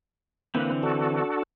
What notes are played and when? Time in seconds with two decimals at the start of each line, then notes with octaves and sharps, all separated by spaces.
0.55 D3 E3 A#3 C4 B4
0.83 D4 F#4 A4